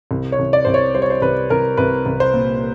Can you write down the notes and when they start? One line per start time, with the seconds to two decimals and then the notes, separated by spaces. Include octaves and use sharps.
0.11 C2
0.32 C#5
0.39 C2
0.53 D5
0.65 C2 C5
0.74 C#5
0.95 G3 C5
1.02 C#5
1.10 C5
1.22 C2 B4
1.50 C2 A#4
1.77 C2 B4
2.06 C2
2.20 C5
2.34 A#2